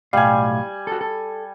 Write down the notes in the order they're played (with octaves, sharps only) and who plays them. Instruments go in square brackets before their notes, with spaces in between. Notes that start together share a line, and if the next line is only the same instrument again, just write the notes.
[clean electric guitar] B1 A2 F5 [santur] G3 G#5
[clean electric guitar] F#4 A4
A4